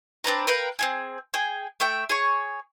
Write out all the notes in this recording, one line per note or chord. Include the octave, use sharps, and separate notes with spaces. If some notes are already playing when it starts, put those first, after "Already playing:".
C4 D4 B4 A#5
A#4 B4 F5 G5
C4 F4 G#4
G#4 G5
A3 E5 G5
G#4 C#5 C#6